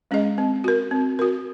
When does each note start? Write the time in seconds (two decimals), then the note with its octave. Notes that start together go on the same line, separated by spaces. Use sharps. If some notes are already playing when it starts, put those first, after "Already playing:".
0.11 G#3 C#4 G#4 D#5
0.38 C4
0.64 F#4 A#4
0.91 C4
1.19 F#4 A#4